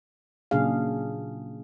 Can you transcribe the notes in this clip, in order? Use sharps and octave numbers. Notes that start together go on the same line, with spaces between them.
A#2 C#3 F#3 D4 G#4 F5